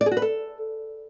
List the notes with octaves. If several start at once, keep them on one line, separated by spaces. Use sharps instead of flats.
D5
G#4
F#4
B4
A4